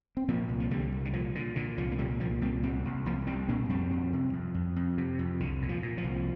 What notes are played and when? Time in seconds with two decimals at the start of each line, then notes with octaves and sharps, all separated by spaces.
0.17 C4
0.28 A#2 F3 A#3
0.49 C2
0.60 F3
0.71 C2 D3 G3
0.92 C2
1.05 D3
1.13 A#2 F3
1.35 A#2 D3
1.56 A#2 D3
1.77 C2 F3
1.92 A#3
1.98 A#2 D3 G3
2.20 C2 F3 A#3
2.41 A#2 G3 C4
2.63 C2 G3 C4
2.85 C2
3.06 C2 F3 A#3
3.27 C2 G3 C4
3.48 A#2 A#3 D4
3.69 F2 G3 C4
3.91 F2
4.13 C3
4.33 F2
4.54 F2
4.76 F2
4.98 C3
5.19 F2
5.40 C2 D3
5.62 A#2
5.69 F3
5.83 A#2
5.98 F3
6.04 C2